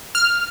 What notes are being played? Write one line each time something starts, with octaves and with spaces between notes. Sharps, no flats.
F6